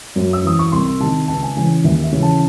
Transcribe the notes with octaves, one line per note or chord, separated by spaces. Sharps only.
F#2
E6
E3 D#6
C#6
C2 C6
C3 D#3 A5
C#2 A5
G#5
C#3 E3 G#5
D#2 E5
E5
C#3 E3
A5